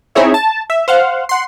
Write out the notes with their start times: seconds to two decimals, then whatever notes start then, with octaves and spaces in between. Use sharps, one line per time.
0.15 C4 D#4 E4 G#4 C#5 E5
0.34 A5
0.70 E5
0.88 C5 F5 F#5
1.29 F#5 C6